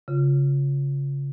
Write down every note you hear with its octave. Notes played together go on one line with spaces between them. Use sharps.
C#3 F4